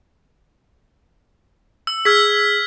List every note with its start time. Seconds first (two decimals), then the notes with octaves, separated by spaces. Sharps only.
1.87 E6
2.05 G#4 E6 F6 G#6 B6